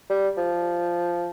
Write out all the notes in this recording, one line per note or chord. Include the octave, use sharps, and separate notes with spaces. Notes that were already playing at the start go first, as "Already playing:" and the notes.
G3
F3